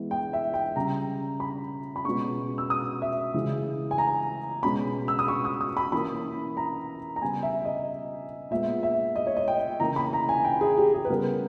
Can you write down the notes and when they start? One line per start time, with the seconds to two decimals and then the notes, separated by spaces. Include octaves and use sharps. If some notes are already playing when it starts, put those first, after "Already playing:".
Already playing: E3 G#3 B3
0.11 G5
0.33 E5
0.54 G5
0.76 C#3 G3 C#4 A#5
1.40 B5
1.96 B5
2.05 B2 G#3 C#4 C#6
2.58 E6
2.70 D#6
3.02 E5
3.34 C#3 E3 G#3 C#4
3.91 G#5
3.98 A#5
4.63 B2 G#3 C#4 B5
5.08 E6
5.19 D#6
5.28 C#6
5.45 D#6
5.61 D#6
5.77 B5
5.92 E3 A#3 C#4 B5
6.57 A#5
7.16 A#5
7.22 C#3 G3 B3 G#5
7.43 E5
7.65 D#5
8.51 A#2 G#3 B3 E5
8.83 E5
9.16 D#5
9.27 C#5
9.37 D#5
9.48 G5
9.80 C#3 E3 A#3 A#5
9.96 B5
10.13 A#5
10.29 G#5
10.44 G5
10.61 G#4
10.77 G4
10.94 G#4
11.05 B4
11.09 C#3 G3 B3 A#4